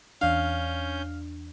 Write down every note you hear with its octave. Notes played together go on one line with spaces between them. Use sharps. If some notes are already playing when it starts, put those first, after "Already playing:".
E2 C#4 D4 F5 G6